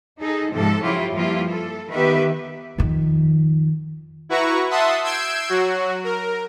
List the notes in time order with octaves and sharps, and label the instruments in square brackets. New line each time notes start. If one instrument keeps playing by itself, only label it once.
[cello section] D#4 G#4 A4
G#2 C3 F3 A4
C#3 F3 F#3 E4 F4 G4
G2 F3 A#3 E4 F4 G4
A4
D#3 B3 G4 B4 E5
[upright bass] F2 D#3
[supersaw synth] E4 F#4 B4 A#5 C#6
E5 F#5 A5 C6 D#6
E6 G6 G#6 C7 D7 E7
F#3 F#4
A#4